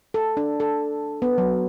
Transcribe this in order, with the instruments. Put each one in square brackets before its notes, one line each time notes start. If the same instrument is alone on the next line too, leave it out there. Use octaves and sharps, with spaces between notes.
[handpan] A4
D4
A4
B3
F#3